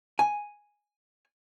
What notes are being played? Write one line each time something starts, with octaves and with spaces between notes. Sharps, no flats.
G#5